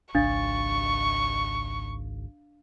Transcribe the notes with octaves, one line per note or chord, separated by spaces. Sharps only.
G#1 C#2 D4 F5 C#6 A6